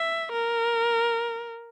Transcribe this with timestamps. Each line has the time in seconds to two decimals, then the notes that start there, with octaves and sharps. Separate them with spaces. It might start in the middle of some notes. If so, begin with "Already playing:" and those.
Already playing: E5
0.32 A#4